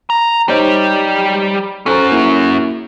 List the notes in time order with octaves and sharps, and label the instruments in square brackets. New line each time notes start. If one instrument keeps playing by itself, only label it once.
[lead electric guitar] A#5
[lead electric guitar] G3 G4 [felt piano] D#4 C5 C#5
[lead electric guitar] C#4 F#4 [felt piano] A4 C5 A#5
[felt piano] A#3 E4 G#4